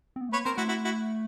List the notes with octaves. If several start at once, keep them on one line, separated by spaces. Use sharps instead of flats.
C4
B3
A3
A#3 B4 C#5
C4 A#4 C5
A3 E4 F#4
E4 F#4
E4 F#4